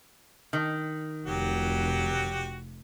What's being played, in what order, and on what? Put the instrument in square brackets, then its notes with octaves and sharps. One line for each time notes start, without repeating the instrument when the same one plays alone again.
[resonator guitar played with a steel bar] D#3
[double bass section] F1 [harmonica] F#3 F#4 G4